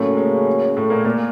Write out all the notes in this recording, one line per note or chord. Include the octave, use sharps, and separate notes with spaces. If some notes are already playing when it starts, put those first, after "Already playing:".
Already playing: A2 C#3 F#3 A3 A#3 C#4
G#3
A2 A3
A#2 A#3
A#2 A#3